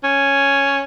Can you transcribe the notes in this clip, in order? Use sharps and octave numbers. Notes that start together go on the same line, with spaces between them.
C#4